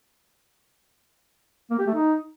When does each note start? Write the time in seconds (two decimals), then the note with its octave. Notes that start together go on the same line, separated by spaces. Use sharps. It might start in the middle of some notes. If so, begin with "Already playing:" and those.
1.71 A#3
1.79 G4
1.87 A3
1.95 D#4